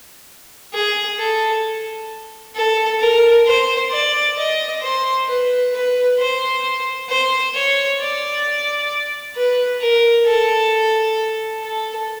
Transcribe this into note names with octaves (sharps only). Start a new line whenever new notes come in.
G#4
A4
A4
A#4
C5
D5
D#5
C5
B4
B4
C5
C5
C#5
D5
B4
A#4
A4
A4